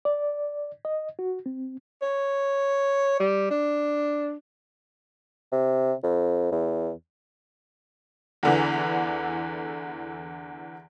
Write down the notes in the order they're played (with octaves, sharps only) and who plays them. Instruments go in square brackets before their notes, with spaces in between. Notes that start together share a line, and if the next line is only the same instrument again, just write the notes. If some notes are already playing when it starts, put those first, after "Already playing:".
[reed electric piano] D5
D#5
F#4
C4
[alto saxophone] C#5
G3
D4
[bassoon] C3
F2
E2
[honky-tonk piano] E2 D3 E3